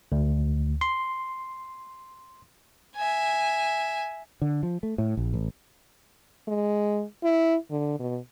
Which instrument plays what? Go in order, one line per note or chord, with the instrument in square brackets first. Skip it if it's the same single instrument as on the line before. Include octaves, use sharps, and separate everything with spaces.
[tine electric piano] D2
C6
[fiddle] E5 G#5
[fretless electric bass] D3
F3
A3
A2
A#1
A1
[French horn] G#3
E4
D3
B2